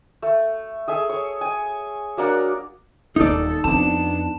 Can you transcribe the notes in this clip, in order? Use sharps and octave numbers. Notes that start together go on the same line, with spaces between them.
A3
G#4 A4 E5
C#5
G#5
F#3 A#3 D4 F#5
D#1 A#3 D#4 A4 D5
F2 B3 D4 E4 A5